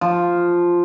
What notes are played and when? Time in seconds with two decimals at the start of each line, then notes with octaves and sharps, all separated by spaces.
0.01 F3